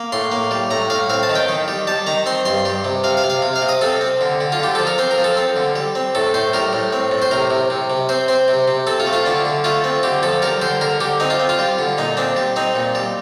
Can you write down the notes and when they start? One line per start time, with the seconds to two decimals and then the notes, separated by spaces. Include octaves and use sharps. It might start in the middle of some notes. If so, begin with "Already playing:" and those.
Already playing: A#3
0.12 A2 C6
0.32 A#3
0.51 G3
0.71 A2 A#5
0.90 A2 F5
1.10 C4 F5
1.23 A5
1.29 D#3
1.35 G5
1.49 D#3
1.68 G3
1.87 G3 A5
2.07 D#3 A#5
2.26 C4 C6
2.45 G2 C6
2.65 G3
2.85 C3
3.04 C3 F5
3.17 F5
3.24 C3
3.30 F5
3.42 C3
3.56 F5
3.62 C3
3.69 D#5
3.81 C4 A4
4.01 C4
4.21 D3
4.41 D3
4.52 F4
4.59 D3 G4
4.75 F3 A4
4.87 A#4
4.98 C4 C5
5.11 A#4
5.18 F3
5.24 A4
5.37 C4
5.56 D3
5.75 G3
5.95 C4
6.15 A2 A4
6.34 A2 C5
6.53 G3 A#4
6.73 A2
6.93 C4
7.11 A2
7.22 C5
7.31 C3 A#4
7.50 C3
7.70 C3
7.90 C3
8.09 C4 C5
8.28 C4 C5
8.48 C3
8.68 C3
8.87 C4 A4
9.00 F4
9.06 A3
9.13 F4
9.26 D3 D4
9.45 D3
9.64 A3 F4
9.84 C4
10.03 D3 G4
10.23 F3 A4
10.42 G3 A#4
10.62 D3 C5
10.81 D3 A#4
11.01 D3 G4
11.20 C4 D#4
11.30 F4
11.40 C4
11.49 F4
11.59 G3
11.78 D3
11.98 A#2 D#4
12.17 C4 D4
12.36 G3
12.56 C4 D#4
12.75 A#2
12.95 G3